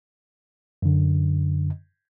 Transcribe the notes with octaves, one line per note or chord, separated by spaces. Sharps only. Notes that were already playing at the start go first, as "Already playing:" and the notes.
F#2 D3